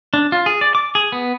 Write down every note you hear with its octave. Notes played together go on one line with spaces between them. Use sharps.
D4
F4
G#4
D5
D6
G#4
B3